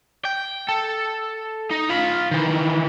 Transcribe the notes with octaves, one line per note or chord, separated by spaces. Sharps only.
G5
A4
D#4
F4 B5
D#3 E3